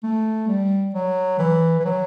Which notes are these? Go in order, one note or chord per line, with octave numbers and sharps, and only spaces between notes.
A3
G3
F#3
E3
E3
F#3